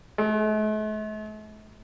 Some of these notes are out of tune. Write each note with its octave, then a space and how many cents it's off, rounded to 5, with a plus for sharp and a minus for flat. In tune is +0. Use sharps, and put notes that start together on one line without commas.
A3 -45